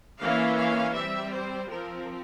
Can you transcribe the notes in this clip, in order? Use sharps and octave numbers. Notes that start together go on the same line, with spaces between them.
E3 A#3 C#4 F5
F5
G3 C4 E5
C5
F3 C4 A#4